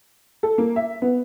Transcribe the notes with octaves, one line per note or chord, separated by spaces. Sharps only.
A4
A#3
E5
B3